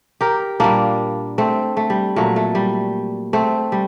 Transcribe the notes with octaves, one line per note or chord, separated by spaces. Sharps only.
G4 A#4
A#2 G3 A#3 D4
A3 C4
A3
G3
A#2 F#3 A3
A3
G3
A3 C4
G3